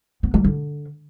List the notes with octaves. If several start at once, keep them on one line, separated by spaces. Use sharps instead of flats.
B3
G3
D3